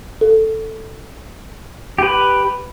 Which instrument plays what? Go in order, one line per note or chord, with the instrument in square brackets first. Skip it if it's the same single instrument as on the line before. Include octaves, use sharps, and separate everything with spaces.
[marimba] A4
[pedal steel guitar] G4 B4